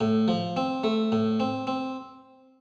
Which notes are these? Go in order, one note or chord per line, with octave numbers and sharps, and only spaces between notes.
A2
F3
C4
A3
A2
C4
C4